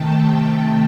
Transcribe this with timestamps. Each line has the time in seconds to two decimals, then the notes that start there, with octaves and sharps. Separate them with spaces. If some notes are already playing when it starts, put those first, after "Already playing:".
Already playing: C3 D#3 A3 G5 A5
0.16 A5